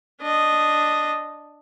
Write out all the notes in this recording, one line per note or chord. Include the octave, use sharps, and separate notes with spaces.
D4 D#5